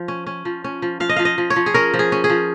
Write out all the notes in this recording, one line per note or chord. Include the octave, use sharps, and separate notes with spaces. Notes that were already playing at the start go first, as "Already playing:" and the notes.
Already playing: F3
C#4
C#4
F3
C#4
F3
F3 F5
D#5
F3 F5
D#5
F3
C#5
F3
G#4
C#4 A#4
F3
G#4
C#4
G#4
F3